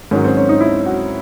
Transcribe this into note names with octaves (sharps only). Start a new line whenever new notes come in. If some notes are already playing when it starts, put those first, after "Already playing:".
G#2 D#3 F#3 C#4
C4
C#4
D#4
E4
F#4